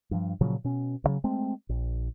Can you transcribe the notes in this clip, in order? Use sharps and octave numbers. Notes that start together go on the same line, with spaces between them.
G2 F3
A#2 C#3 F3 F#3
B2 C#4
D2 C#3 F#3
G#3 A3 C4
A#1